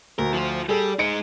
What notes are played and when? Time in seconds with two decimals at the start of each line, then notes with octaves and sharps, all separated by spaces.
0.19 D2 A#4
0.34 F3 F4
0.69 G3 G#4 A4
0.99 G#3 D#4 C#7 D7